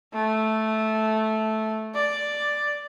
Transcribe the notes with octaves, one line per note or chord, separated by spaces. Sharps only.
A3
D5